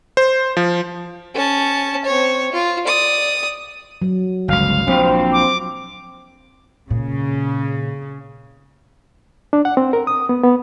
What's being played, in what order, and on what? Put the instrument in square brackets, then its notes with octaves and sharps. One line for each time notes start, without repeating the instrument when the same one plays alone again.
[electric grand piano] C5
F3
[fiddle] C#4 A5
C4 C#5
F4
D5 D#6
[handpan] F#3
[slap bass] G1 C#2 [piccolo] F5
[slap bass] A#1 [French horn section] C4
[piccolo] D6
[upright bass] A#2 [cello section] C#3
[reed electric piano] D4
F#5
C4
A#4
D#6
B3
B3